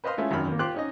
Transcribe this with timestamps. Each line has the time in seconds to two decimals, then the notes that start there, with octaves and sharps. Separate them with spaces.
0.04 B4 C5 D#5 F5 C6
0.17 G#3 A3 C#4 E4 F4
0.31 G#1 F#2 D#3 B5 F6
0.48 D#2 A#3
0.59 F4 G4 C5 C6 D6 F#6
0.74 C#4 D#4 D#5